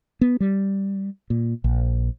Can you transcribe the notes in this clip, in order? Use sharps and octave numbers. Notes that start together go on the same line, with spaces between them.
B3
G3
A#2
A#1